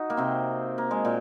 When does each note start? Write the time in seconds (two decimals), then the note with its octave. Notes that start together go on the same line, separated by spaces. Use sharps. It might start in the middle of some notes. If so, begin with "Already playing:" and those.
Already playing: D#4 F#4
0.10 A#3
0.17 C3 C4
0.78 A#3
0.91 G#3
1.05 A#2